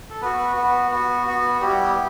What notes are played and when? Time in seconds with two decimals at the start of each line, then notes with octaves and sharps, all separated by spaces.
0.10 A4
0.22 B3 F#4 B4
0.56 B3 F#4
0.91 B3 F#4
1.27 B3 F#4
1.61 G3 B3 E4 G4